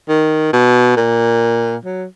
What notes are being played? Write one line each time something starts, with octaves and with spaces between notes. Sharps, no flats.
D#3
B2
A#2
F#3